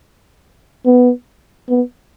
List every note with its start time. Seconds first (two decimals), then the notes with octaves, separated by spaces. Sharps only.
0.86 B3
1.69 B3